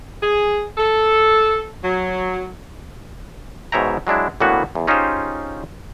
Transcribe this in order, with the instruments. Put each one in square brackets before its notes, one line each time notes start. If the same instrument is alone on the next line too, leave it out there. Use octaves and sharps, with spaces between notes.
[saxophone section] G#4
A4
F#3
[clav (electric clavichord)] G#2 B2 C#5 E5 G5 A#5
F#3 G#3 D4 E4
A2 D3 E3 A#3 B3 F#4
E2
C#4 D#4 F4 G4 G#4 C5